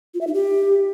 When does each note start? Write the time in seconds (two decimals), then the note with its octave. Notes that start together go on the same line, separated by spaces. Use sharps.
0.14 F4
0.21 E5
0.27 D#4
0.34 G4